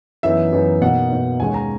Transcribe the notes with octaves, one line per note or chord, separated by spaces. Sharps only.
F#2 E3 B3 D#4 E5
F#2 E3 B3 D#4
B2 A#3 D#4 F#5
B2 A#3 D#4
D#2 D#3 G#3 C#4 G#5
A#5